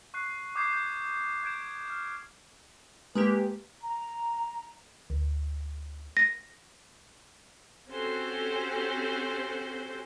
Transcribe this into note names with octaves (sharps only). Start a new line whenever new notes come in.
C#6 F#6 C7
D6 D#6 G6 G#6 C7
G6
G6 G#6 D7 E7
F6
G#3 A#3 G4 B4
A#5
D2
A#6
C4 C#4 F#4 G4 A4 C5